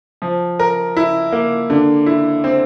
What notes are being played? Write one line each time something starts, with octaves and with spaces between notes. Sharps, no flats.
F3
A#4
E4
A#3
D3
E4
C4